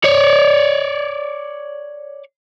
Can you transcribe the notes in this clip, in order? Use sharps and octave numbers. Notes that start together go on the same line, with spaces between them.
C#5 D5